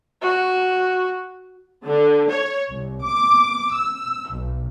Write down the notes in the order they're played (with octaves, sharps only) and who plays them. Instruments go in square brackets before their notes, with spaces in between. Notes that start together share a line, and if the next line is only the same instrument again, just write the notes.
[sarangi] F#4
[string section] D3
C#5
C2
D6
E6
B1